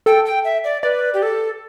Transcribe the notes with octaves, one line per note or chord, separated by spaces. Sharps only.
A4 G5
G5
E5
D5
B4 D5
G4
A4